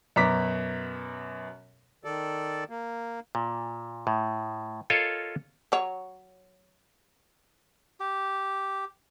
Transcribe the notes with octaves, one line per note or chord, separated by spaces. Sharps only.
F#2 B2 A#5 D6 B6
D#3 A4 D5
A#3
A#2
A2
F4 A4 A#4 C#5 D#5 F5
F#3 C#5
G4